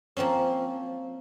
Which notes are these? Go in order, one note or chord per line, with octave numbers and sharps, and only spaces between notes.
F3 A#3 C4 C#4